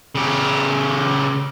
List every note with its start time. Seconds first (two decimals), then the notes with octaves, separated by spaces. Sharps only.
0.15 C#3 G4